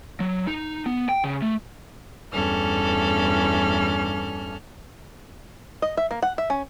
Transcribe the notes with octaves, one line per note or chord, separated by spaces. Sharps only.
F#3
D#4
B3
G5
C#3
A3
E2 G2 C#4 A4 F6
D#5
E5
A#3
F#5
E5
C#4